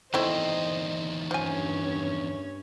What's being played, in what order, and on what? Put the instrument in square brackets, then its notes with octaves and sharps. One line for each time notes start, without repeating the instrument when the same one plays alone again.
[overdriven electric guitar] E2 D#3 [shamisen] A3 C4 E4 [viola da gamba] C5 D#5
[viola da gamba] G2 C#4 C#5 [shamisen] F3 G#5